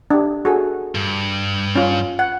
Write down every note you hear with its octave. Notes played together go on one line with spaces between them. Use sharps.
D4 G4
F#4 G#4 A4
G2
C#4 F4
F#5